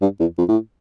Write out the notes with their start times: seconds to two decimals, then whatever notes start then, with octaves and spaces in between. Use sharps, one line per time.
0.02 G2
0.20 E2
0.38 F2
0.48 A2